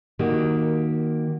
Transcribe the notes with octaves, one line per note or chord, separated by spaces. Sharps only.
D#3 A#3 F#4 G4